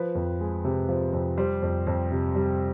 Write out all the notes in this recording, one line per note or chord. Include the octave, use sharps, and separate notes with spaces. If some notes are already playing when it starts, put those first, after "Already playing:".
Already playing: F3 B4
F2
G#3
C3
F3
F2
G3 C5
F2
F2
C3
G3